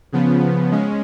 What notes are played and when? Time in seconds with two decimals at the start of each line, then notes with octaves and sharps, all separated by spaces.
0.12 C#3 F3 B3
0.72 G#3 C#4